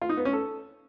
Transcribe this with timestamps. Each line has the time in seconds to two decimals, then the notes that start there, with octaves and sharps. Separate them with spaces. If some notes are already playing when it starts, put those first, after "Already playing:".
0.02 F4
0.09 D#4
0.17 B3
0.25 C#4
0.33 A4